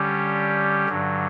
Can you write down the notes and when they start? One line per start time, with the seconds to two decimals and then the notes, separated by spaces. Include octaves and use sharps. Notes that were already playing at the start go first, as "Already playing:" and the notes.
Already playing: D3 G3 C#4 G4
0.88 G2 D3 F#3